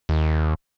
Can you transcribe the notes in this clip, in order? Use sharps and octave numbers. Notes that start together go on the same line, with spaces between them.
D#2